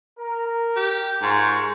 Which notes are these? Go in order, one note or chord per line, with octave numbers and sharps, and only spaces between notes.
A#4
G4
G#2 F4 A#4 C#6